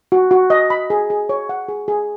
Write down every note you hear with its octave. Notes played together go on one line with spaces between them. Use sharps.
F#4
F#4
D#5
B5
G#4
G#4
C#5
F#5
G#4
G#4